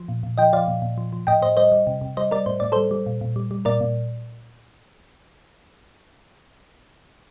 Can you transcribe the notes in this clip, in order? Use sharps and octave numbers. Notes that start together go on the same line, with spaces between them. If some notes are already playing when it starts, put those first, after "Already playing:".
Already playing: F3
A#2
A#2
F3 D#5 G5
F3 D5 F5
A#2
A#2
F3
F3
A2 D#5 G5
A2 C5 D#5
G3 C5 D#5
G3
C3
C3
G3 C5 D#5
G3 A#4 D5
A2 C5
A2 D5
G3 A4 C5
G3
A#2
A#2
G3
G3
A#2 A#4 D5
A#2